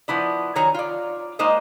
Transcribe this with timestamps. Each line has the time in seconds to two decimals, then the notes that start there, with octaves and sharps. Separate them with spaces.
0.08 F3 B3 E4 D5
0.56 D#3 F#3 C#5 G#5 A#5
0.74 F4 D5
1.39 G#3 A#3 D#4 C5 D#5